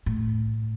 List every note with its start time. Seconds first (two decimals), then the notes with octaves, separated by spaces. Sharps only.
0.06 A2